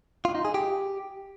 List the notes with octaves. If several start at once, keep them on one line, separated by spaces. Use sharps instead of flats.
F4
D#4
G#4
G4